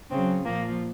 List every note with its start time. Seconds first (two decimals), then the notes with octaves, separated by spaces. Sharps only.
0.10 C#3 F#3 C4
0.44 A#2 F3 A#3